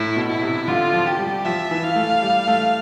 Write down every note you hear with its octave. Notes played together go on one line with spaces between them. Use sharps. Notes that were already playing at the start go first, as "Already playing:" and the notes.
Already playing: A2 E4
B2
E4
C3
D3 F4
F3
G4
G3
F3 E5
E3
F5
A3
G3
A3